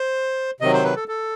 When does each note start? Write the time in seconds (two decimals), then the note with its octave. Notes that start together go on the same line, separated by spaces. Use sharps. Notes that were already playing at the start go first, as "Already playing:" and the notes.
Already playing: C5
0.60 C3 D#3 F#3 D#5
0.73 C5
0.84 B4
0.96 A4
1.08 A4